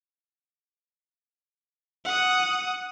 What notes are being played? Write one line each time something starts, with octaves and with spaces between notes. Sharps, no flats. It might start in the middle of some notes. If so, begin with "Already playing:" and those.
F#5 D#6